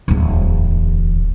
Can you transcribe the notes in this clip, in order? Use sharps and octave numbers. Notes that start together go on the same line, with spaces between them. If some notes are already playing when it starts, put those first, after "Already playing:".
D1 E2